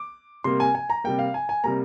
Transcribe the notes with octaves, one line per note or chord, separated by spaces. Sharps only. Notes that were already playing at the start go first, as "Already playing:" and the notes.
Already playing: D6
C3 G3 A#3 C6
G#5
G#5
A#5
C3 G3 A#3 G5
F5
G#5
G#5
C3 G3 A#3 A#5